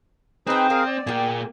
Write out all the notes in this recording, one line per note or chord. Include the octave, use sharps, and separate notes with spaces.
C4 D#4 G#4 B4 C5 G5
G#4 A#4 D#5 F5
D5
A#2 A#3 G#4 G5